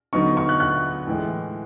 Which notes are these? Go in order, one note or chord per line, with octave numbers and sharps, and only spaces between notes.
D3 F#3 B3 D#4 C#6
C#6
F#6
F#6
A2 E3 G#3